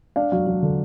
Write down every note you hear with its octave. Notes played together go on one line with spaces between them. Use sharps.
D4 F5
F#3 F5
F#3
D3